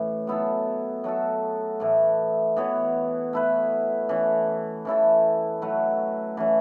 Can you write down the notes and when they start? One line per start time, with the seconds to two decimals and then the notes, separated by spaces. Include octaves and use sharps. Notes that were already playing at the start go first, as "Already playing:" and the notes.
Already playing: A2 E3 C#4
0.27 F#3 B3 E4 A4
1.04 F#3 A3 F#4 A4
1.80 A2 E3 A3
2.57 E3 B3 F#4 C#5
3.33 A3 E4 B4
4.09 E3 C#4 A4
4.85 E3 C#4 E4 A4
5.62 F#3 A3 F#4 B4
6.37 E3 A3 C#4